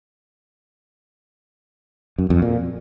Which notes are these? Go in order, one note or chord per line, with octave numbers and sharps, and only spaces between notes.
F#2
F2
A#2